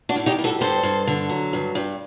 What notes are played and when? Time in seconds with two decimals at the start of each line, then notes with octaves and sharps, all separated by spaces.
0.09 D4 F#4
0.16 A2
0.26 D#4 G4
0.39 G3
0.44 F#4 A4
0.61 G2 A4 C5
0.83 G2
1.07 D3
1.30 F#3
1.53 G2
1.75 G2